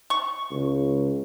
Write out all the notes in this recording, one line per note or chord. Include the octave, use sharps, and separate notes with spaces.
C#6
C#2